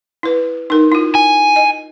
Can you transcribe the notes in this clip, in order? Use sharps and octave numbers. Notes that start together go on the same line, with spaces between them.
E4 B4
D#4 A#4
E4 F4
G#5
D#5